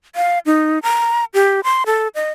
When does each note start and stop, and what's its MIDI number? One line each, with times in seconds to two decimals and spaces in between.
0.15 0.39 77
0.46 0.79 63
0.83 1.25 82
1.34 1.60 67
1.64 1.83 84
1.86 2.08 69
2.15 2.32 75